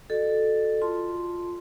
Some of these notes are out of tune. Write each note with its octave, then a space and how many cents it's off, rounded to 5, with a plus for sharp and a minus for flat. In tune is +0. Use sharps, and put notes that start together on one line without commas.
F#4 +0 A4 +0 D#5 -45
F4 +0 A5 +0 C6 +0